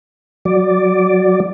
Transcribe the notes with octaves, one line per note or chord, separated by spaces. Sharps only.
F#3 D5